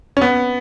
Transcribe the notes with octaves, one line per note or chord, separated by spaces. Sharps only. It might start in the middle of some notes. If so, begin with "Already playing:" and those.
C#4
B3